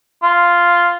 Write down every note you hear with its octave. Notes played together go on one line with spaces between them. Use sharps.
F4